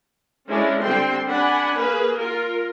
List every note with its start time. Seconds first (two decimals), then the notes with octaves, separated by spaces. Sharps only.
0.48 G#3 C#4 D4 E4
0.82 D3 G3 C4 G5 C6
1.29 D4 F#5 G#5 B5
1.79 A#3 G#4 B4
2.17 F4 A#4